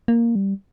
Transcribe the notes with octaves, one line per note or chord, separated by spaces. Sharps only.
A#3
G3